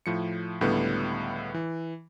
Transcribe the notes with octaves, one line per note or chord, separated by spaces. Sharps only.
A2 F3 C#7
C#2 A2 D3 G3 B3
E3